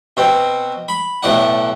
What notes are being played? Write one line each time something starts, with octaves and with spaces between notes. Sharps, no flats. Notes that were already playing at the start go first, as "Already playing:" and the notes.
B2 C4
B5
B1 A2 D5 F#5